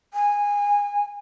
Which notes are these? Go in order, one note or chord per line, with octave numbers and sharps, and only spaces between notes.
G#5